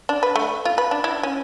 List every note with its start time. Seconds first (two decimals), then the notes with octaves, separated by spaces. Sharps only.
0.09 D4
0.23 B4
0.36 A3
0.65 F4
0.78 B4
0.91 D4
1.04 E4
1.23 C#4